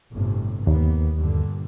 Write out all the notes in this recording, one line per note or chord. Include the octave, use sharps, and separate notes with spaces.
G1 A2 C3
D#2 A#3 B3
G2 A#2 D3